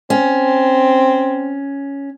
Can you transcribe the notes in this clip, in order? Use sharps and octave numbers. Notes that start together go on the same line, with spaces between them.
C4 C#4